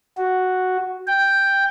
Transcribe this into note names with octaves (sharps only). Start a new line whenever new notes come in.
F#4
G5